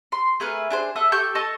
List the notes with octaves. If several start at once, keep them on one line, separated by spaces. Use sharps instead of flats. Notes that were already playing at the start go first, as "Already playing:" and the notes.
C6
A3 G#4 A#4 B4
D4 G#4 C5
A4 E5 D#6
G4 A4 C#6 G6
A4 D#5 A5 C#6